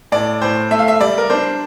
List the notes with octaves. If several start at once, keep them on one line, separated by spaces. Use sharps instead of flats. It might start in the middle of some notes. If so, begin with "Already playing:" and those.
A2 D5
A2 C5
A3 E5
F5
E5
G3 D5
A#4
D4 C5